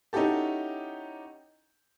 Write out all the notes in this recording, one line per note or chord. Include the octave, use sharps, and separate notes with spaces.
C#4 D#4 E4 F#4 G4 A4